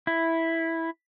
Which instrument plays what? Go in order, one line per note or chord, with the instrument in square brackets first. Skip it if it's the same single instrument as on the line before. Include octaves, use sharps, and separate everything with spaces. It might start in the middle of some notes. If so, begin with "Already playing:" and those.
[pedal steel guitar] E4